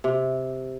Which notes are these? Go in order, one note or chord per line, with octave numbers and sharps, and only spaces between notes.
C3